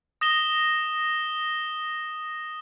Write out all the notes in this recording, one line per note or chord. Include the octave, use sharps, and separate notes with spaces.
D#6 A#6 E7 G7